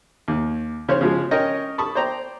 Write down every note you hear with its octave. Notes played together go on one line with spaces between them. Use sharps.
D#2
C#3 C5 C#5
C#3 F3 G#3
C#4 A#4 C#5 D#5 G5
A5 B5 C#6 D#6
C5 D5 G5 A#5